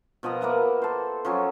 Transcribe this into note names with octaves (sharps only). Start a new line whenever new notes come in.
B2 F3 D#5 A#5
A#3 B4 E5 F#5
A4 C5
F3 F#3 C#4